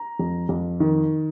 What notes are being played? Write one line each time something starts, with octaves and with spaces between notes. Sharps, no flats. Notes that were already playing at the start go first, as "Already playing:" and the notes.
Already playing: A#5
F2
F2
D#3